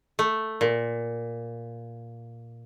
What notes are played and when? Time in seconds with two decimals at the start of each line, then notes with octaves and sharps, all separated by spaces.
0.19 A3
0.61 A#2